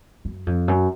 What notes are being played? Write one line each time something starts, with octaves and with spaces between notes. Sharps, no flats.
F#2
F2
F#2